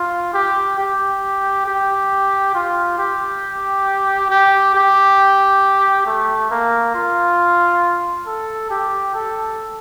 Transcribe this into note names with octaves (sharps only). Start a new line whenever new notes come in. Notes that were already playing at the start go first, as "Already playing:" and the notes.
Already playing: F4
G4
G4
G4
F4
G4
G4
G4
A3
A#3
F4
A4
G4
A4